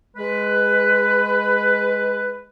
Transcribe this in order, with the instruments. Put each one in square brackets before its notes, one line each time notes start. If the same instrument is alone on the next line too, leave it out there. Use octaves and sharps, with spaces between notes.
[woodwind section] G#3 B4